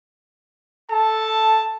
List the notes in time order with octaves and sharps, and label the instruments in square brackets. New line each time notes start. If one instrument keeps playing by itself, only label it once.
[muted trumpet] A4 [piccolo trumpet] A5